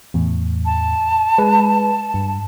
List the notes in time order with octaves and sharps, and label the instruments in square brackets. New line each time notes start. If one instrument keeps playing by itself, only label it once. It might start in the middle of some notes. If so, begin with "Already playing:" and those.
[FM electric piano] E2 A2
[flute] A5
[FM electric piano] G#3 B4
G2